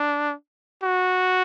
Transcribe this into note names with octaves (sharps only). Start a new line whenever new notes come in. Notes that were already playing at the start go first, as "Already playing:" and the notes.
Already playing: D4
F#4